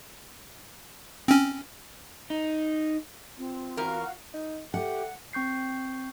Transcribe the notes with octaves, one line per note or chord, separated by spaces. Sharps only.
C4 C#4
D#4
C4 F4
E2 F#4 A#4 F5
D#4
A3 G4 F#5
C4 C#6 G6 C7